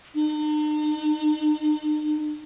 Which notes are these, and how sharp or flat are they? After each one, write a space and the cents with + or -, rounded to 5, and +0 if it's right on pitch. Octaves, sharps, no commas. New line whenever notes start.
D#4 -45